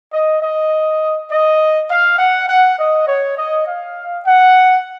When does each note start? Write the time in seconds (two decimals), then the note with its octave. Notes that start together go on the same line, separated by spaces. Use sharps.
0.13 D#5
0.42 D#5
1.30 D#5
1.89 F5
2.18 F#5
2.48 F#5
2.77 D#5
3.07 C#5
3.36 D#5
3.66 F5
4.25 F#5